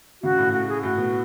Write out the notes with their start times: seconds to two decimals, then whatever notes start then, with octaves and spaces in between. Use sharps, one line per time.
0.22 C#3 F#4
0.38 A2
0.53 F#4
0.68 G#4
0.83 A2 F#4
0.97 B2